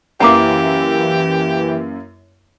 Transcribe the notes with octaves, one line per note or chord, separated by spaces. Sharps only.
F#2 E3 A#3 E4 G4 F#5 A#5 D6